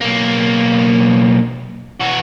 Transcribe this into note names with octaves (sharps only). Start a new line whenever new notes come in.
B1 A#3
E3 F#4